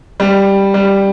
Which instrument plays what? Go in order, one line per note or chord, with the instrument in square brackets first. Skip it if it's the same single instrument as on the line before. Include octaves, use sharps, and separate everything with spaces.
[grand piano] G3
G3